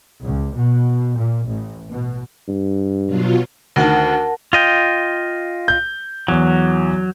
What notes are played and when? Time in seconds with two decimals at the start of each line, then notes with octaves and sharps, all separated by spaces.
0.25 C#2
0.57 B2
1.17 A#2
1.49 A1
1.91 B2
2.48 G2
3.06 B2 F#3 F4
3.76 D2 D#3 A#4 F#5 A5
4.53 F4 D#5 G5
5.68 G6
6.28 E2 F#3